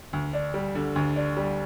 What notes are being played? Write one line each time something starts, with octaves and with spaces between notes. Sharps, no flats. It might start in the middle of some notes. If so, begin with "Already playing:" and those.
D2
D4
G3
D3
D2
D4
G3